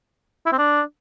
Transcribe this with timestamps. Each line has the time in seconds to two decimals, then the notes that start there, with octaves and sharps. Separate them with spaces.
0.46 E4
0.52 C4
0.58 D4